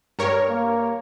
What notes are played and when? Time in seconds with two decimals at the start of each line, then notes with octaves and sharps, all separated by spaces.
0.19 G2 A#4 C#5
0.49 A#3